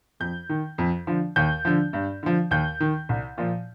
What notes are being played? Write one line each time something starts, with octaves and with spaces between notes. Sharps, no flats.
F2 G6
D#3
F2
D3 F3
D#2 G6
D3 F3
G2
D3 F3
D#2 G6
D#3
C2
A#2 F3